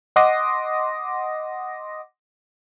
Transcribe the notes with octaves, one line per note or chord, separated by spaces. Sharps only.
D#5 F#5 C6 D6 D#6 A#6